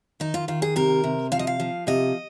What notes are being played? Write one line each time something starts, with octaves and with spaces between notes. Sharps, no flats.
D#3 D#4
F4
D#3 F4
G#4
C3 A#4
C3
F3 F5
D#5
F5
F3
C3 D#5